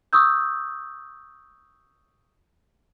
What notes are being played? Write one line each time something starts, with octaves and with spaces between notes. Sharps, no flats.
C#6 D#6 E6 G6